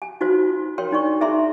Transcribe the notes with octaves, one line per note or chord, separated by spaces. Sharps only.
G#5
D#4 F4 F#4 C5
A#4 C#5 G5 C6
D4 D#4 D5 C#6
D#4 G#4 E5 A#5 C6